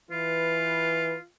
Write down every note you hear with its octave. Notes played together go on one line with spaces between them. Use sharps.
E3 F4 B4